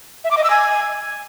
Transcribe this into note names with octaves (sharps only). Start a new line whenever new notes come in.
E5
D6
D#5
E6
G#5